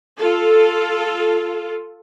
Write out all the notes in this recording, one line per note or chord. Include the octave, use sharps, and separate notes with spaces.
F4 A4